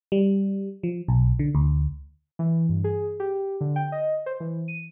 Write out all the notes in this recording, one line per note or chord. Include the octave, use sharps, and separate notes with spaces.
G3
F3
B1
D3
D2
E3
G2
G#4
G4
D3
G5
D#5
C5
E3
D#7